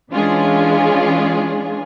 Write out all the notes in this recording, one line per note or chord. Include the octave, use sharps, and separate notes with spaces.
E3 G#3 C#4 D4 F4 G#4